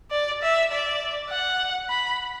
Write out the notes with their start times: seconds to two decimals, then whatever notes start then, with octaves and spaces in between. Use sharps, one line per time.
0.11 D5
0.42 E5
0.72 D5
1.30 F#5
1.89 B5